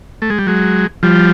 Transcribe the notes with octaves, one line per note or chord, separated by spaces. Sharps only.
A3
G#3
G3
F#3 G#3
F3 G3